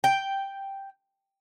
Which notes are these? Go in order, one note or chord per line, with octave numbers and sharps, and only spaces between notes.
G5